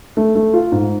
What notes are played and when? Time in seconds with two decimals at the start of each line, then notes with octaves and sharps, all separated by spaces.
0.17 A3
0.35 A3
0.54 F4
0.72 G#2